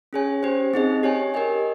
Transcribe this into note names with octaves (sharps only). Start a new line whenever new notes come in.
C#4 G#4 C#5 G#5
C#4 G4 C5
C4 D#4 G#4 D#5
G4 C#5 G#5
G4 A#4 D#5 G#5